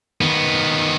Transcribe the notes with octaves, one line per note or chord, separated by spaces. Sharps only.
D#3 B3